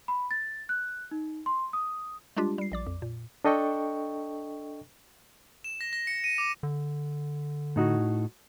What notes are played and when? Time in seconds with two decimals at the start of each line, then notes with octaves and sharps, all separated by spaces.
0.08 B5
0.31 A6
0.69 F#6
1.11 D#4
1.46 C6
1.73 D#6
2.36 G3 G#3 D4 F4 G4
2.58 G3 C7
2.72 A#1 D5 D6
2.86 F2
3.02 A#2
3.45 D4 A4 D#5 G5 C#6
5.64 E7
5.81 A#6
5.93 A#6
6.07 C#7
6.24 D#7
6.38 D6
6.63 D3
7.76 A2 D#4 F#4